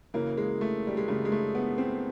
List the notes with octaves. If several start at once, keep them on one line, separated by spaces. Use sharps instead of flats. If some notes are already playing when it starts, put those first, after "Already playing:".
F#2 C#3 E3 A#3
G#3
A3
G3
G#3
F#2 C#3 E3 A3
G#3
A3
B3
C4